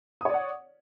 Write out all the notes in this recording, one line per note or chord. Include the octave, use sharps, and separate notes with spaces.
C#5 D5 F#5 D#6